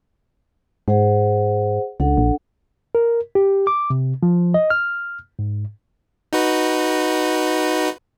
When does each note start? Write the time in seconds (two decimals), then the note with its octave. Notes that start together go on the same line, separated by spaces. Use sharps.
0.88 G#2 G#4 C5 F#5
2.00 C#2 D4 A4 F#5
2.18 A#1
2.95 A#4
3.35 G4
3.67 D6
3.90 C3
4.23 F3
4.54 D#5
4.70 F6
5.39 G#2
6.33 D#4 F#4 B4